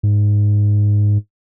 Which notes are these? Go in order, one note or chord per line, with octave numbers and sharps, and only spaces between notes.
G#2